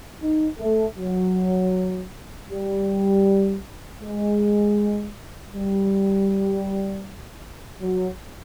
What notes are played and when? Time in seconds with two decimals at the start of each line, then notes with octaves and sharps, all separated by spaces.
0.22 D#4
0.59 A3
0.97 F#3
2.49 G3
4.01 G#3
5.53 G3
7.82 F#3